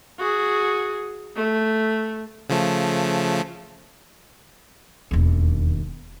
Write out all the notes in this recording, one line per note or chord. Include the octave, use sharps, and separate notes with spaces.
F#4 G#4
A3
C#3 F3 A3
E1 D#2